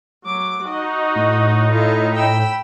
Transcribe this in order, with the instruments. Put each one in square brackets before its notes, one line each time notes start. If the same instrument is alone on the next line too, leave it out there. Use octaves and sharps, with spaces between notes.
[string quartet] F#3 D6
[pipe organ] D#4 [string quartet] F#4 D#5
[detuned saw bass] A2
[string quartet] E4 F4 A4
G5 B5 E6